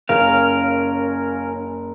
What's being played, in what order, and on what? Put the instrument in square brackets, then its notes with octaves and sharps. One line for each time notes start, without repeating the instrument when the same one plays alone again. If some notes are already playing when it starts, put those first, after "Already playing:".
[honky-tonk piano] F#1 [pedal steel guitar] C#4 A#4 F5